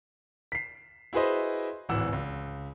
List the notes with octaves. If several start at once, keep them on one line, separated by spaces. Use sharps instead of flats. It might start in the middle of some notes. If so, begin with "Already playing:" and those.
B6 C7
E4 F#4 G#4 B4 C5 D#5
D1 G#1 E3 F#5 E6
C#2